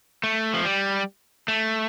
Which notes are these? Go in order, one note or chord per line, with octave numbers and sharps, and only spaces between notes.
A3
F3
G3
A3